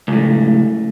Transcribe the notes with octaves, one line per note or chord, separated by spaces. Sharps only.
C#2 A2